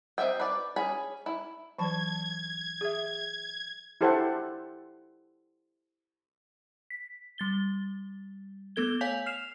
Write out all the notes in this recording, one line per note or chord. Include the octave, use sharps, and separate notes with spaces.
C4 D#5 E5 G5
B4 D5
C#4 G#4 B5
E4
E3 F#3 A5 G#6
G#4 E5
E4 G4 A4 C5 E5 F#5
B6
G3 A6 G7
A3 B3 A4 G#6 G7
C#5 F5 G#5 G6 B6 F7
F6 C7 E7 F7